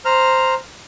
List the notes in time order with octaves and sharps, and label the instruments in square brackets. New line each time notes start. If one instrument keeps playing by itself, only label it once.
[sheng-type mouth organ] C5 A#5 F6